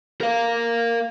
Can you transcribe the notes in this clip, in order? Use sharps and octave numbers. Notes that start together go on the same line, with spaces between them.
A#4 F5